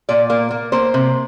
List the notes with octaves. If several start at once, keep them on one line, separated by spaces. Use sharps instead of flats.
A#2 D5
A#3
A#3
A#3 C5
C3